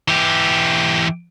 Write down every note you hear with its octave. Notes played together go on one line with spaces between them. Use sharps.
E3 G4